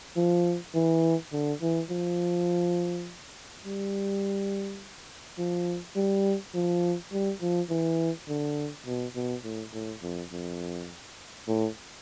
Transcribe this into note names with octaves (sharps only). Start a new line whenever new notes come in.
F3
E3
D3
E3
F3
G3
F3
G3
F3
G3
F3
E3
D3
B2
B2
A2
A2
F2
F2
A2